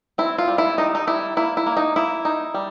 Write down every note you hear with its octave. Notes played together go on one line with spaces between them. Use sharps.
C4 E4
F4
G3
E4
D#3 D#4
D#4
G3 E4
A#3 E4
E4
A#3
D#4
A#3 E4
D#4
G3